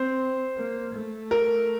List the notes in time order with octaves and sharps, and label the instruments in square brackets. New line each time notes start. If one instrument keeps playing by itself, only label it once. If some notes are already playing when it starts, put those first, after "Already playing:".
Already playing: [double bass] C4 [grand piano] C5
[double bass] A#3
A3
[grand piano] A#4